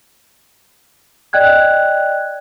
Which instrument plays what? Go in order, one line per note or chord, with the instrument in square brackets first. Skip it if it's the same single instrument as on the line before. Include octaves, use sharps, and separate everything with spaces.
[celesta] D5 D#5 G5 F#6 G#6